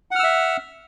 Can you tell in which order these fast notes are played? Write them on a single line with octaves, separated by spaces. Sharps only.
F#5 F6 E6 E5